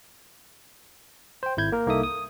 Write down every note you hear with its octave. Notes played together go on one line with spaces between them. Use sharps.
C5 G5
G#1 E4 G6 G#6
A#3 A#4
C2 A#3 D#4 A4 E5 D#6
D#6